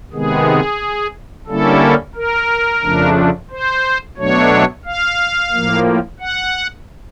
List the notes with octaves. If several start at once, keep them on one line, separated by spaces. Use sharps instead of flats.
C3 D#3 G#3 B3 G#4
D3 G3 A#3 C#4 E4 A4
A#4
F2 C#3 F3 A3 D4
C5
B2 F#3 A3 D4 C#5
F5
A2 F3 A#3
F#5